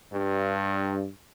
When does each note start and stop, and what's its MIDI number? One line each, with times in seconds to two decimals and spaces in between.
0.13 1.07 43